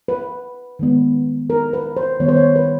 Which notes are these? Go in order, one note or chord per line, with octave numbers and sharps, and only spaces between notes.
B4
D#3 G#3 B3
A#4
B4
C5
D#3 G3 B3 C#5
C5
C#5
B4